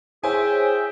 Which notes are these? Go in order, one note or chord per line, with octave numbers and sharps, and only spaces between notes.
E4 G#4 C5 C#5 E5 G5 G#5